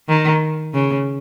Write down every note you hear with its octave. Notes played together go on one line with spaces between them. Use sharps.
D#3
C#3